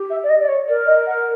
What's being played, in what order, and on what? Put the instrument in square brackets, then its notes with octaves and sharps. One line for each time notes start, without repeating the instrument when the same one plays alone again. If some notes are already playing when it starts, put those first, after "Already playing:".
Already playing: [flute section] G4
[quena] E5
D5
D#5
D5
C#5
[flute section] A#4 [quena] D5
[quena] D#5
F#5